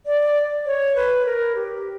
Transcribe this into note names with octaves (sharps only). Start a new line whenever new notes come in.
D5
C#5
B4
A#4
G4